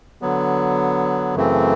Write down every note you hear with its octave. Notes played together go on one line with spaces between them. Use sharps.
D3 F#3 B3
F#2 C#3 E3 A3 C4